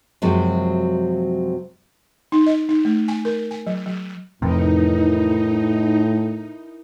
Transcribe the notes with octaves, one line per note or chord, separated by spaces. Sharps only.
F#2 C3 F3 F#3 G#3
D#4
D#5
D#4
A3
G#5
A#4
G#5
F#3
F#3
F2 A2 C3 E3 D#4 A#4